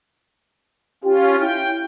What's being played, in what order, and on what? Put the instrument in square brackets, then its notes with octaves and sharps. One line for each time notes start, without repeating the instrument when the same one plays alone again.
[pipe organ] C#4 F4 [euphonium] G4
[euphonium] E4 [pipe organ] G5